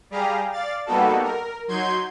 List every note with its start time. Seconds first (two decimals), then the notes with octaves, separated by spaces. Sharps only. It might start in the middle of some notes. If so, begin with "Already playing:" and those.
0.11 G3 G4 G#4 F5 A#5
0.52 D5 F5 A6
0.86 G3 A#3 B3 D#4 F#4 A4
1.23 A#4
1.68 F#3 D#4 C6 G6 G#6